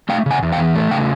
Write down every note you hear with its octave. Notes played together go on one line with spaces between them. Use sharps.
A3 F5 G5
C#3 F#5 G#5
E2
F5 G5
E3
A3
C#3 F5 G5